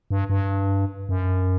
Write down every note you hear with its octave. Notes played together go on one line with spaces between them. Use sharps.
G2
G2
F#2